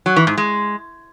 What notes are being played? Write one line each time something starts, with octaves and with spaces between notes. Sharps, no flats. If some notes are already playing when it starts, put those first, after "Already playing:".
F#3
E3
G#2
G#3